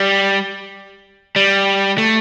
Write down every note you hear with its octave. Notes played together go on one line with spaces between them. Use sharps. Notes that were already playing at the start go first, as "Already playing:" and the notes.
Already playing: G3
G3
A3